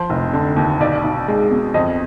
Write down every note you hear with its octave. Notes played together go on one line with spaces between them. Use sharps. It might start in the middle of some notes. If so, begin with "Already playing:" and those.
Already playing: F3 C5
F1
D3
D#2
B1 D5
B1
G#3
B2
F2 D#5